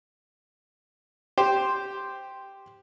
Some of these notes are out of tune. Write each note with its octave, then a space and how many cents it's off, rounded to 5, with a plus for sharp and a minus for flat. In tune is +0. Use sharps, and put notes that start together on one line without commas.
G4 +0 C5 +0